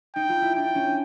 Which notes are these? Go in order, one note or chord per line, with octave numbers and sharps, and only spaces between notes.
D#4 G5
F4
E4
D4 G5
C#4